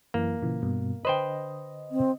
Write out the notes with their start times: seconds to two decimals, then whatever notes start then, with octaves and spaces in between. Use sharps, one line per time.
0.14 F#2 E3 A#3
0.43 A#2 C#3 E3
0.62 G2 B2
1.05 D3 B4 C5 D#5 G5
1.91 C4